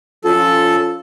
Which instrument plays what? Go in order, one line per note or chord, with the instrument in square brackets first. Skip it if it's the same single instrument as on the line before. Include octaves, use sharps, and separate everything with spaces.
[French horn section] F3 C#4 F4 [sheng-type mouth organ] A4